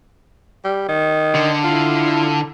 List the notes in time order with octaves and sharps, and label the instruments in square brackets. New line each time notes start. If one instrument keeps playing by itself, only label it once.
[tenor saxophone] G3
D#3
[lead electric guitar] D3
[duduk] E4 [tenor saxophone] F4